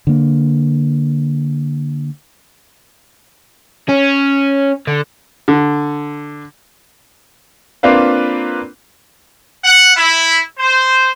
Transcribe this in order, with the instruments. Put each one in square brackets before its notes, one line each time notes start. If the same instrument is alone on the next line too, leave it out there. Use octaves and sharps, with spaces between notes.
[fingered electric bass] D3 A#3
[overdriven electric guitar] C#4
D3
[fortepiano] D3
[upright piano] A#3 C4 D4 F4 B4 F5
[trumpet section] F#5
E4
C5